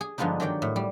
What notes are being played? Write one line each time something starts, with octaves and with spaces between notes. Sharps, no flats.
G#4
G2 D3 F3 G#3 B3 D#4
D#3 F#3 D5 G5
A2
G3